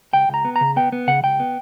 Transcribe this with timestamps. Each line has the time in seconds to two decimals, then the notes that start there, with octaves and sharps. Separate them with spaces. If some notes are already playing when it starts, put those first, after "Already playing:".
0.13 C#2 G5
0.29 C#2
0.34 A#5
0.45 B3
0.56 A#5
0.61 C#3
0.76 B3 G5
0.92 B3
1.07 C#3 F#5
1.24 C#2 G5
1.40 B3